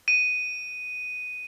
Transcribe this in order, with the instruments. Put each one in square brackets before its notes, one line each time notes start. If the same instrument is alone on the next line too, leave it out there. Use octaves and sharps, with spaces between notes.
[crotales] D#7